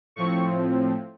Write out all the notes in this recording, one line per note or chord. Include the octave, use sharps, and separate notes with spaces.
A2 F3 C4 C#6